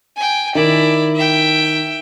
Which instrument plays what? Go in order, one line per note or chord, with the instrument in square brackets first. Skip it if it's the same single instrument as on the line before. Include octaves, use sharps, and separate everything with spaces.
[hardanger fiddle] G5 G#5
[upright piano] D#3 [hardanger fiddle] E4 D5
[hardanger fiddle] E5 G5